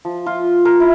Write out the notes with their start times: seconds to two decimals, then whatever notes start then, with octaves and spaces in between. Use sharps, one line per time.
0.05 F3
0.26 F4
0.65 A#4
0.80 E4